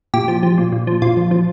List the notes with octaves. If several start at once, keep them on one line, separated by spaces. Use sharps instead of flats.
A#2 G4
F3
F3
A#2
A#2
F3
A#2 F4
F3
F3